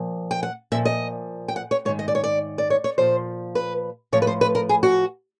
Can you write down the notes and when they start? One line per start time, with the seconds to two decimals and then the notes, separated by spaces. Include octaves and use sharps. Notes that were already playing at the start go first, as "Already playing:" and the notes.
Already playing: A#2 F3
0.31 G5
0.43 F#5
0.72 A#2 F3 E5
0.85 D#5
1.48 G5
1.56 F#5
1.71 C#5
1.85 G#2 C#5
1.88 D#3
1.99 D#5
2.08 D5
2.15 C#5
2.24 D5
2.58 D5
2.70 C#5
2.84 C#5
2.98 A#2 F3 C5
3.55 B4
4.12 A2 F3 C#5
4.22 B4
4.27 C5
4.41 B4
4.55 A#4
4.69 G#4
4.83 F#4